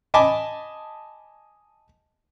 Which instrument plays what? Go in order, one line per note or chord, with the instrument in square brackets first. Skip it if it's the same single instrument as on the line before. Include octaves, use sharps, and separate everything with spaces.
[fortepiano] D#5 G#5 A5 B5 D6